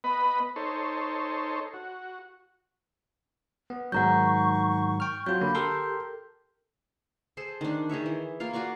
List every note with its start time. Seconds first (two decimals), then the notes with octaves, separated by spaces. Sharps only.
0.04 B3 B4 D#5 B5
0.56 D#4 A4 C5 C#5
1.74 F#4
3.70 B3
3.92 G#2 D#3 F#3 F#5 A#5 C#6 G6
5.00 G5 F6
5.26 F#3 C4 F4 F#4 G6
5.41 D3 A#3 B5
5.55 G4 A4 A#4 C6
7.37 G#4 A4 C5
7.61 D#3 D4
7.89 D#3 G#4 C#5 E5
8.06 E3
8.40 A#3 F4 F5
8.53 F4 F#4 D5 C#6